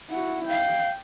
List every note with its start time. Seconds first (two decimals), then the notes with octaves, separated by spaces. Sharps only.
0.10 E4 F#4 F#5
0.48 F5 G5